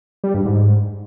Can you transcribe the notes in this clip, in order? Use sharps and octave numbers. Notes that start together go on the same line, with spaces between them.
G3
G2
G#2